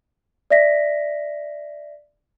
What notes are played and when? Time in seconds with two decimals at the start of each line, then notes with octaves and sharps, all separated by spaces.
0.50 D5 E5 A#6 B6